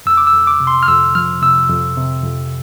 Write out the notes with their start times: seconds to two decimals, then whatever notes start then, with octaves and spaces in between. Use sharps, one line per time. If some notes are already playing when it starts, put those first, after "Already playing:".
0.06 F2 E6
0.17 D6
0.27 E6
0.33 F2
0.47 D6
0.60 C3
0.67 C6
0.83 F6
0.88 F2 E6
1.15 F3 F6
1.42 C3 E6
1.70 F2
1.97 C3
2.24 F2